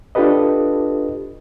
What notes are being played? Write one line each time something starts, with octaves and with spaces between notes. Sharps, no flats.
D4 F4 G4 A4 B4 D#5